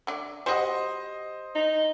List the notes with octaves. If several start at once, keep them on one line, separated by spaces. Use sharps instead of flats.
D3 A3 D5
G3 F#4 C5 D#5 F#5
D#4